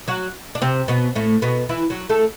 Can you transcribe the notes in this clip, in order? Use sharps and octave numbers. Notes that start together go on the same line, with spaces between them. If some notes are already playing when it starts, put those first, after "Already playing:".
F#3 F#4
D4
C3 C4
B2 B3
A2 A3
B2 B3
E3 E4
F#3 F#4
A3 A4